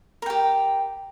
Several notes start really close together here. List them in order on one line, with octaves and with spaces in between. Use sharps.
A#4 G5 G4